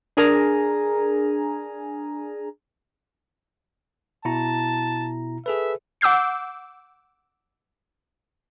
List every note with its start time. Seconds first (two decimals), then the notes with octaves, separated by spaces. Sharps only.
0.17 D4 G#4 A#4 G#5 A#5
4.25 B2 E4 A5 A#5
5.46 G#4 A4 B4 E5
6.01 F#5 D6 E6 G6 C7